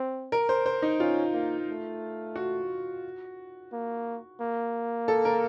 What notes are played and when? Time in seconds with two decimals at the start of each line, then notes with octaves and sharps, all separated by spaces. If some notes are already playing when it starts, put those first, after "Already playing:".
Already playing: C4
0.32 A#4
0.49 C5
0.66 C5
0.82 D#4
1.00 C#4 F4
1.33 A#3
1.68 A3
2.36 F#4
3.72 A#3
4.41 A#3
5.08 A4
5.25 A#4